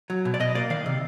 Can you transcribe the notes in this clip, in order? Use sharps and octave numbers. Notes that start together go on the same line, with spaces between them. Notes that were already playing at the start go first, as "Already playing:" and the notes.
F#3
B2
D5
B2 D#5
A#3 D5
D#3 F5
C3